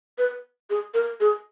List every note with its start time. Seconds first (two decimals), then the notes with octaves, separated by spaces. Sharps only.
0.18 B4
0.70 G#4
0.94 A#4
1.20 G#4